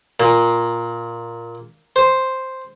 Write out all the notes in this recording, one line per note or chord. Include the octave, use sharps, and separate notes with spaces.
A#2
C5